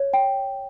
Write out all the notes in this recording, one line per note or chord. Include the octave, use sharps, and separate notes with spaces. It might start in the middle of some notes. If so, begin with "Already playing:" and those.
Already playing: C#5
G5